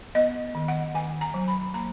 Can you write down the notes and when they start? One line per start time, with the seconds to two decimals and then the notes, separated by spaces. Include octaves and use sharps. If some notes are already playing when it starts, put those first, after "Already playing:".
0.15 B3 D#5
0.55 D#3
0.68 F#5
0.95 D#3 G#5
1.21 A#5
1.34 F#3
1.48 B5
1.74 A#3 A#5